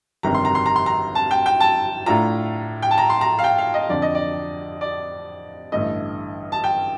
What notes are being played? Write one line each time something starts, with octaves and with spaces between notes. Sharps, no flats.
G1 F2 C3 D#3 G3 A#5
C6
A#5
C6
A#5
C6
A#5
A5
G5
G5
A5
A2 A3 D4 F4 A#5
G5
A5
A#5
C6
A#5
F5
G5
F5
D#5
F2 D3 F3 D5
D#5
D5
D5
A1 G2 D3 A3 D#5
A5
G5